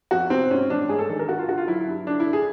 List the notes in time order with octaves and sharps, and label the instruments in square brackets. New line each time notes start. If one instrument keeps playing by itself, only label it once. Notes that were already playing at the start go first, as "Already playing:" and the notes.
[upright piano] F2 F#4
C3 C4
G#2 C#4
A1 D4
G#2 G#4
A4
D#3 A4
A#4
G2 F#4
F4
D3 F#4
F4
F#3 E4
E4
G2
D3 D4
E4
D3
G#4